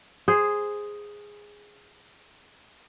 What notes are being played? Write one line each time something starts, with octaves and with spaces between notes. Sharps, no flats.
G#4 C5